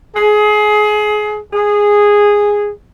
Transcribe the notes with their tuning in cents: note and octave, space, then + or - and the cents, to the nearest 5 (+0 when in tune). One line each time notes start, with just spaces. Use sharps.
G#4 +25
G#4 -10